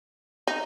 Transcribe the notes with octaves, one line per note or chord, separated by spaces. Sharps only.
D#4